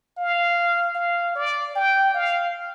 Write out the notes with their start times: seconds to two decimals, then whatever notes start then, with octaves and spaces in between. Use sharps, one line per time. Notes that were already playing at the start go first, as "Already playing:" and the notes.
0.18 F5
0.95 F5
1.35 D5
1.75 G5
2.15 F5